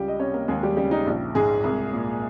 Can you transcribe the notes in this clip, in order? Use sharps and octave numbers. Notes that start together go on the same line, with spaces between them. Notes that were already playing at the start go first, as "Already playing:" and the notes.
Already playing: C#2 G3 G4
D#5
C3 C#4 C#5
A#3 A#4
D#2 G#3 G#4
G3 G4
C#3 G3 G4
D#4
A#1
G#2 G#3 G#4
C2
A#2